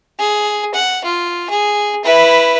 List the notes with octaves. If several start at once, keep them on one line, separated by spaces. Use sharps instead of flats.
G#4
F#5
F4
G#4
E4 B4